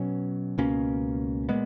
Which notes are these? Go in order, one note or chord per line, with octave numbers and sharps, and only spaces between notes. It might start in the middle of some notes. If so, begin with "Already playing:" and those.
Already playing: B2 F#3 C#4
C#2 B2 A#3 C#4
A#2 G#3 B3